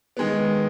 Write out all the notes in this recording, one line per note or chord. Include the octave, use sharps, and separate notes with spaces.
D#3 G#3 B3